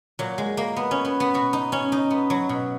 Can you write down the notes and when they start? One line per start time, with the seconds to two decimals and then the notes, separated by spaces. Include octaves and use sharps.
0.19 A#2 F#3
0.38 G#3
0.57 A#3
0.76 B3
0.91 C#4
1.05 B3
1.20 B3
1.34 B2 F#4
1.53 D#4
1.72 C#4
1.92 D#4
2.11 B3
2.30 F#3
2.49 B2